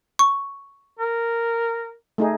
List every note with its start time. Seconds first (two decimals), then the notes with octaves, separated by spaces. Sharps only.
0.19 C#6
0.99 A#4
2.18 A3 D#4 G#4